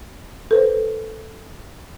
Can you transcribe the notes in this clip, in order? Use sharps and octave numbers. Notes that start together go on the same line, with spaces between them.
A4 B4 C5